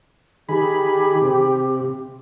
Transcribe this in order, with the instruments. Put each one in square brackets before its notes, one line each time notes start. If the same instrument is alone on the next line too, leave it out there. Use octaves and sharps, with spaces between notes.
[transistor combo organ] D#3 G#4 B5 [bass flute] G4
[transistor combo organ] C3